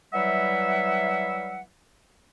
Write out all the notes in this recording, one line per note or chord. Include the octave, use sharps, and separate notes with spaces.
E3 F#3 G3 E5 F#5